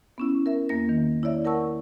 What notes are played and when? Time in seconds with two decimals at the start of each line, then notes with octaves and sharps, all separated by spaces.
0.18 B3 C#4 E4
0.46 A#4 E5
0.69 E2 A#3 A#6
0.89 D#3
1.23 E4 C#5 D5 E5
1.45 E4 A#4 F#5 A5 C#6 E6